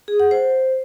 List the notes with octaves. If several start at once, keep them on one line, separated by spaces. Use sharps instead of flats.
G#4
F#5
C5